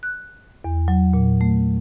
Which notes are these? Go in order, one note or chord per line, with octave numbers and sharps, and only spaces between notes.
F#6
E2
F#3
A#2
A3